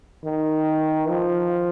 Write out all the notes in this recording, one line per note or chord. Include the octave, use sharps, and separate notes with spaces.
D#3
F3